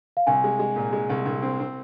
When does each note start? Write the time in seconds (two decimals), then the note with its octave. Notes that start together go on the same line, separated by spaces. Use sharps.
0.17 F5
0.27 C2 G#5
0.44 G#3
0.59 G#3
0.76 A#2
0.92 G#3
1.10 C2
1.25 C2
1.42 C4
1.60 C4